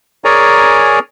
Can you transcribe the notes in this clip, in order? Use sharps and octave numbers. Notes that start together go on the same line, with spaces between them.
G#4 A#4 C#5 D5 G#5 A#5